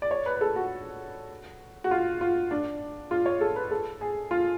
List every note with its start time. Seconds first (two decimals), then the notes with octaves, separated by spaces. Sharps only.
0.02 D5
0.11 C#5
0.26 B4
0.36 B4
0.41 A4
0.56 F#4
1.84 F#4
1.91 F4
2.21 F4
2.51 D4
3.11 F4
3.26 C#5
3.41 A4
3.56 B4
3.71 A4
4.01 G#4
4.31 F4